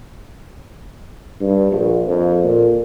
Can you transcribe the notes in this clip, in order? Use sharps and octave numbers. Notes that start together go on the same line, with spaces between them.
G2
A#1
F2
A#2